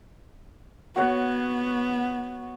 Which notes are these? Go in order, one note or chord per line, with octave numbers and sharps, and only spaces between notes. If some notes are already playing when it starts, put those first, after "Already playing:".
B3 F#4 C#5 F#5